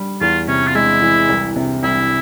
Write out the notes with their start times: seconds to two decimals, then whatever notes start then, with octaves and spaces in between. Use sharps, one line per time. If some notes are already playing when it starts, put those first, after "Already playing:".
Already playing: G3
0.21 E2 F4
0.48 C3 C#4
0.67 F4
0.75 G#3 E4
1.02 E3
1.29 C2
1.56 C3
1.83 C2 E4